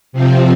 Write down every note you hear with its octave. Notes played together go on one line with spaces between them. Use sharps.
C3 F3 C4